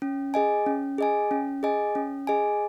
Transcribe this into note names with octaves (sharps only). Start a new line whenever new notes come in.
C#4
G#4 D#5 G#5
C#4
G#4 D#5 G#5
C#4
G#4 D#5 G#5
C#4
G#4 D#5 G#5